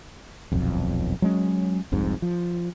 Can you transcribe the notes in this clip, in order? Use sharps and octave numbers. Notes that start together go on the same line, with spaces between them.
D#1 B1 F2
F#3 G#3 C#4
F1 C2 F2 G#2
F3